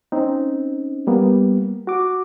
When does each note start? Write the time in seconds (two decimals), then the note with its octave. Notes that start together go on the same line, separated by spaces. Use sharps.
0.12 C4 C#4 D#4
1.07 G3 A#3 B3
1.87 F#4 D6